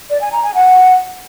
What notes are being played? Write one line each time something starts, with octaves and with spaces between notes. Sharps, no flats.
D5
G#5
A#5
G#5
F#5